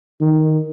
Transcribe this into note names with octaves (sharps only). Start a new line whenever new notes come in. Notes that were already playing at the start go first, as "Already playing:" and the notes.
D#3